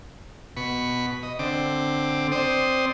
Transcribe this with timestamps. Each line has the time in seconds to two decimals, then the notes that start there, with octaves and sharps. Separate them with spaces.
0.57 B2 B5 C#6
1.23 D#5
1.39 D3 C4 D6
2.32 C4 C5 D5 D#6